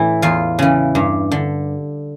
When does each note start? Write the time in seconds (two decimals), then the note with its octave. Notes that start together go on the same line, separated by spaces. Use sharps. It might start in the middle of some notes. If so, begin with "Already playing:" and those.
Already playing: A2 E3 E4
0.22 E2 F4
0.59 C#3 E3
0.95 G2
1.32 D3